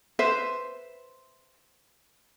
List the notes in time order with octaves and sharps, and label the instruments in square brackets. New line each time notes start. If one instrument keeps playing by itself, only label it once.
[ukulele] B4 C5 E5